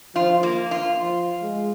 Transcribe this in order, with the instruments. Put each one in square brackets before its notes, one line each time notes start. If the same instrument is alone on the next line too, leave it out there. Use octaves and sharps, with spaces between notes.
[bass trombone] F3 [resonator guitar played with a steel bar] F4
[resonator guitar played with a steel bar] A#3
F4
[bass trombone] F3
G#3